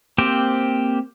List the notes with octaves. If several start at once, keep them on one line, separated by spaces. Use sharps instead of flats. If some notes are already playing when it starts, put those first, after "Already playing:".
A#3 C4 G4 C5